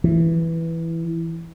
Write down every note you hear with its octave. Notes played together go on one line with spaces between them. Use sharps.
E3